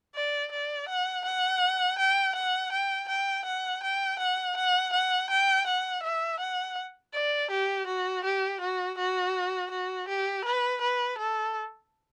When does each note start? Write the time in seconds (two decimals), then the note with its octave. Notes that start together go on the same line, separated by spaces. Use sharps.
0.15 D5
0.52 D5
0.89 F#5
1.26 F#5
1.99 G5
2.36 F#5
2.73 G5
3.09 G5
3.46 F#5
3.83 G5
4.20 F#5
4.57 F#5
4.93 F#5
5.30 G5
5.67 F#5
6.03 E5
6.40 F#5
7.14 D5
7.51 G4
7.87 F#4
8.25 G4
8.61 F#4
8.98 F#4
9.71 F#4
10.08 G4
10.45 B4
10.82 B4
11.19 A4